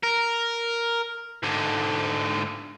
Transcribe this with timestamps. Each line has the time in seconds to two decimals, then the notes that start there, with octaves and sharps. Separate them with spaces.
0.03 A#4
1.43 G#2 D3